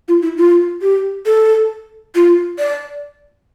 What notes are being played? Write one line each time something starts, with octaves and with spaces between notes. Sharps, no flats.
F4
E4
F4
G4
A4
F4
D5